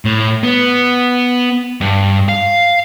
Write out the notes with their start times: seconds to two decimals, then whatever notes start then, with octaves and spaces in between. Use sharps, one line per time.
0.05 A2
0.43 B3
1.81 G2
2.28 F5